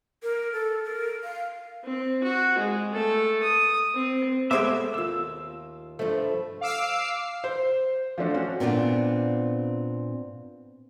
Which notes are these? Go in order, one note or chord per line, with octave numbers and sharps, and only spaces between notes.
A#4
A4
A#4
F5
C4
F#4
G#3
A3 A4
D#6
C4
G#3 A3 B3 C5 E5 D6 E6 G#6
D#2 F4 E6
G2 F3 A3
F5 D6 E6 C7
C5
F3 A3 D4 F#4
C#4 F#4
A#2 B3 C4 D4 F4